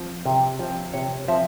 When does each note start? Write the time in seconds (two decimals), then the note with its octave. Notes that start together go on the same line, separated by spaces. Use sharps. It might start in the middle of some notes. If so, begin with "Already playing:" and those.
Already playing: F3 C4
0.26 C3
0.59 F3 C4
0.93 C3 C#5
1.28 F3 C4 E5